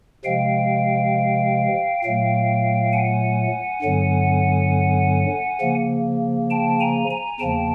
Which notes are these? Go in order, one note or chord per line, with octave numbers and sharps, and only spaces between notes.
C3 F3 G#3 F5 G5
A#2 F#3 A3 F5 G5
F#5 G#5
G2 D3 F#3 B3
C#3 F3 A#3
G5 A5
G#5 A#5
G#5 A#5
E2 C#3 F3 A#3 G5 A5